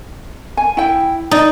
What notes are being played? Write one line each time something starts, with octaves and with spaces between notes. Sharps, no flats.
G#5
E4 G5
D#4 D5